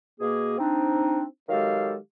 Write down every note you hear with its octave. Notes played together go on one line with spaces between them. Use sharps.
B2 A#3 G#4
C4 D4 D#4
D#3 F#3 G#3 G4 A4 F5